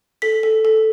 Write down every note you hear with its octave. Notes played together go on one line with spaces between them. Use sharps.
A4 B6
A4
A4